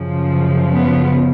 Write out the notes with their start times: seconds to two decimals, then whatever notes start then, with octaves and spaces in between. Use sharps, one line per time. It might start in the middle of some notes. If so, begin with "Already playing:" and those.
Already playing: F#2 C#3 F3
0.72 B3